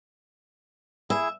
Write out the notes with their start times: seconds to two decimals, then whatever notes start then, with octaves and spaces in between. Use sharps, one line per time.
1.10 E4 G#4 E5